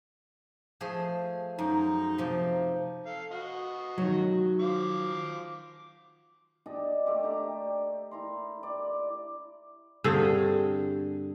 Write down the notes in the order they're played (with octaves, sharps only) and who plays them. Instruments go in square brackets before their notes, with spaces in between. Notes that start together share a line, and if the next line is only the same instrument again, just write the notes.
[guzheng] F3 A3 G#4
[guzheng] F#2 [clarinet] D#4
[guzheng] C3 F3
[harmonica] A4 F5
F#4 D#5
[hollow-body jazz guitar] D#3 F#3
[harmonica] F3 F5 D6
[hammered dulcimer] D4 G4 D5 D#5
A3 G4 D5 E5
D4 G4 A#5
E4 A#5 C6
D5
[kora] G2 D3 C4 G#4